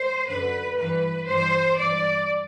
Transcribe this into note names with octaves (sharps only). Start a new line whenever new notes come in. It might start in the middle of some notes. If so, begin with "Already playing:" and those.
Already playing: C5
F#2 D3 B4
G2 E3 B4
G2 E3 C5
G2 E3 D5